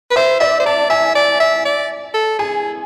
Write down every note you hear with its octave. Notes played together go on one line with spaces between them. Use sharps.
B4
C5 E5
D5 E5
C5
D5 A5
E5 G#5
D5
E5
D5
A4
G#4 G#5